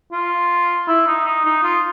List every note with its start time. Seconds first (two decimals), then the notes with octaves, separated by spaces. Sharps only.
0.12 F4
0.88 E4
1.07 D#4
1.25 D#4
1.45 D#4
1.63 F4